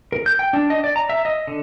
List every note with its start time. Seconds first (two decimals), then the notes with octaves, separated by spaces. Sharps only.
0.12 A#4
0.26 G6
0.39 G5
0.53 D4
0.70 D#5
0.84 D5
0.96 A#5
1.09 E5
1.25 D#5
1.47 D3